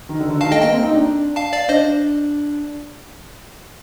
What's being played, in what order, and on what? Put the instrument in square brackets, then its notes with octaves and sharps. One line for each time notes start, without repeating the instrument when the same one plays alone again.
[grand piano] D#3
D3
D3
[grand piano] D#3 [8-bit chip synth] F5 A5
[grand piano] A3 [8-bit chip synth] D#5 G5
[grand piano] A#3 [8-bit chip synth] D#5 G5
[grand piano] C4
D#4
D4
[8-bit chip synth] F5 A5
D5 F5
[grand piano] D4 [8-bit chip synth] C5 D#5